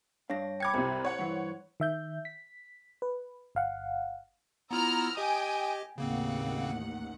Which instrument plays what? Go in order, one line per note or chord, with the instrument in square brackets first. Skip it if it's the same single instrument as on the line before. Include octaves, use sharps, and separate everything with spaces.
[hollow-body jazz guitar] G2 D4 F5 [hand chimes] C#5 A#6
[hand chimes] G5 B5 [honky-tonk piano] D6 G#6 C#7
[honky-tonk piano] C2 C3 [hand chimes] C5
[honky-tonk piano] C#5 F#5
[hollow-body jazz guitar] G2 E3
[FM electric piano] D#3 E5 G6
B6
B4
G1 F5 F#5
[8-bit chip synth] B3 E4 F4 [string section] A#5 E6 F6
[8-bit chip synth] G4 D#5 [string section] G5 G#5 D#6
[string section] A1 D#2 F#5 [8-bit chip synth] C#3 A#3 C4